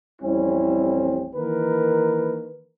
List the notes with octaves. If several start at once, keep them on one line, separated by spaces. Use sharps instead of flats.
A1 F2 G3 C4 C#4 E4
D#3 E3 A#3 A#4 B4